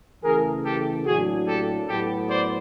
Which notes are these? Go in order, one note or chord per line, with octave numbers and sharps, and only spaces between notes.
C#3 E3 A3 G#4 A#4
G4 A4
A2 F#3 A#3 D4 F#4 G#4
G4 A4
A2 F#3 B3 G4 A4
C5 D5